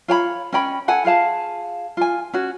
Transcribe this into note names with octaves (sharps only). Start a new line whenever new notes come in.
F4 C#5 G5 B5
C#4 D#5 G5 B5
A4 F#5 G#5
F4 G#4 F5 A5
F4 G#5
C#4 F#4